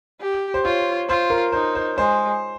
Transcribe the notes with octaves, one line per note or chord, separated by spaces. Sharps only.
G4
C5
F4 C#5
F4 C5
A#4
D#4 C5
C5
G#3 C5